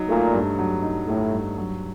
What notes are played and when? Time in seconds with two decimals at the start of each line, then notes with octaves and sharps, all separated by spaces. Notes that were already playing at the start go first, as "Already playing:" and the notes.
Already playing: F#3 D#4
0.09 A#2 A3
0.33 G2
0.59 F#3
0.83 D#4
1.08 A2 A3
1.32 G2
1.58 F#3